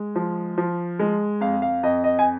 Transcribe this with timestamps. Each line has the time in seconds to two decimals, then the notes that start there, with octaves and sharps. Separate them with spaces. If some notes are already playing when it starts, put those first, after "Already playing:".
Already playing: G#3
0.16 F3
0.58 F3
0.99 G#3
1.41 F2 F5
1.62 F5
1.83 F2 D#5
2.04 D#5
2.19 G#5